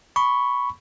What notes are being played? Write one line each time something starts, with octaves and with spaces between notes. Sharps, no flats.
B5 C#6